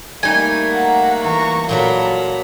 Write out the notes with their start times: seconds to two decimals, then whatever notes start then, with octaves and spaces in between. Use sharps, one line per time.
0.23 G3 A3 A#3 D#4 G#5
0.72 F#5 A#5
1.24 E3 A#5 C#6
1.69 A#2 F#3 F4 F#4 A4 A#5 B5